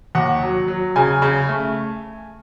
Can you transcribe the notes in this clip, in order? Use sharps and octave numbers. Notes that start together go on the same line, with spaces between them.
D#2 F#5
F#3
F#3
C#3 G#5
C#3
A3